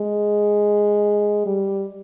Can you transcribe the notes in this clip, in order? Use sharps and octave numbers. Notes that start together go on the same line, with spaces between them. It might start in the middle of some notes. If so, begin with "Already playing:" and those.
Already playing: G#3
G3